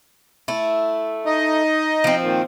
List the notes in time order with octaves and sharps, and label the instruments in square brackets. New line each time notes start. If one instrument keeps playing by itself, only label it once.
[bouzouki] A3 E4
[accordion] D#4 D#5
[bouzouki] F3 C4
[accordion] A#2 D#3